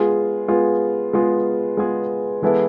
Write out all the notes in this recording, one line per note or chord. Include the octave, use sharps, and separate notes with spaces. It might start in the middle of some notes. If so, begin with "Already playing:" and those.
Already playing: G#3 B3 F4 G#4
G#3 B3 F4 G#4
G#3 B3 F4 G#4
G#3 B3 F4 G#4
E3 G#3 B3 E4 A4